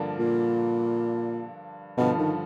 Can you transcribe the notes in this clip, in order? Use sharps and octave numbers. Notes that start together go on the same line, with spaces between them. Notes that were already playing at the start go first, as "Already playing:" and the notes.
Already playing: G2 D3 F3 A#3 D4
A#2
G2 B2 D3 F3
D#3